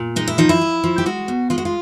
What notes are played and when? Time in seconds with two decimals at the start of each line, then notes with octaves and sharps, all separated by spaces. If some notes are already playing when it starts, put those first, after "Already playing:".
Already playing: A#2
0.16 G#3 D#4
0.28 E4
0.38 F3 D#4
0.49 E4
0.61 F3
0.84 F3
0.98 G4
1.06 G#3 F#4
1.28 B2
1.50 G#3 F4
1.58 F#4
1.65 F4